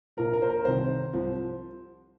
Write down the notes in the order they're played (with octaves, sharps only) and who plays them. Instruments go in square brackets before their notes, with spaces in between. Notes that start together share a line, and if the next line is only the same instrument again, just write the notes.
[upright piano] A#1 A#2 F3 A#4
A#4
C5
A#4
C2 C3 D#3 C5
C2 C3 F3 C4